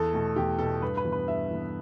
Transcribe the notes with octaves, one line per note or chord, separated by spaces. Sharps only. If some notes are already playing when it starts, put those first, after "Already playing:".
Already playing: E2 A4
B2 A3
E2 G4
B2 A3 A4
G2 B4
B4
E3 B3
B4
G2 E5
E3 B3